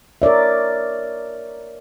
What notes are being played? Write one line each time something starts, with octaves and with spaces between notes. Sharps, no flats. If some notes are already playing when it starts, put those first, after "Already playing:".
A#4 C#5 D5 E5